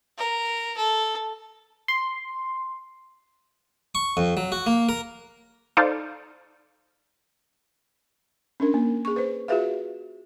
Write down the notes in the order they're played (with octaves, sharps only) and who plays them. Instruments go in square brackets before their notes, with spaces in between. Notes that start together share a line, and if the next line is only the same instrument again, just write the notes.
[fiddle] A#4
A4
[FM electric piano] C6
[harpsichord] C#6
F2
F#3
F#4
A#3
A#4
[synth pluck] D#4 A4 C5 D5 F5
[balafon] C#4 D4 A#4
A#3
G#4 C#6
B4 C5
F4 F#4 G#4 B4 E5 F5